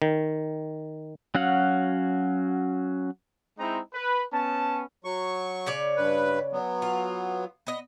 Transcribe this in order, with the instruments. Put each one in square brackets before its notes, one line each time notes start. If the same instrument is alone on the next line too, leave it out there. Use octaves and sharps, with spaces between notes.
[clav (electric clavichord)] D#3
[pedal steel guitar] F#3 C#4 F#4 F5 F#5
[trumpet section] G#3 C4 D#4 E4 G5 A#5
B4
B3 C#4 A5
[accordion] F#3 C#6
[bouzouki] C#3 C#5 D5
[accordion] G2 B4
F#3 B3
[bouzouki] F4
B3 D#5